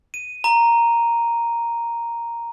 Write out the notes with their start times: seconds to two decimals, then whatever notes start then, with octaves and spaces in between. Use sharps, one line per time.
0.14 D#7
0.44 A#5